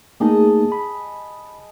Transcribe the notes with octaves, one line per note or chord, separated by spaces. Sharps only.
A3 A#3 D#4 G#4 D#5 A5
B5